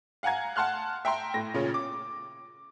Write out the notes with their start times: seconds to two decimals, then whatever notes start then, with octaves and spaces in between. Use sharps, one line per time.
0.23 F5 F#5 G#5 A#5 G#6
0.56 F#5 A5 C6 F6 F#6
1.05 E5 G5 A#5 C6
1.34 A2 A#6
1.54 A#2 C#3 C#4
1.74 D6